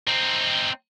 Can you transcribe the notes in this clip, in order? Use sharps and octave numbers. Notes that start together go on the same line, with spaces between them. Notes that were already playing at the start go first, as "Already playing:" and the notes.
C4 D#4